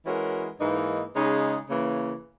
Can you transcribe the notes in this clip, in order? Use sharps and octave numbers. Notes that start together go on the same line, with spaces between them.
E3 G#3 C#4 F#4 A#4
G#2 E3 A#3 D#4
C#3 G#3 D#4 G#4
C#3 E3 A#3